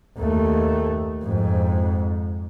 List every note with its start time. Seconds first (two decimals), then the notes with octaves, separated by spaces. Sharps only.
0.17 D#2 A3
1.22 F2 G#2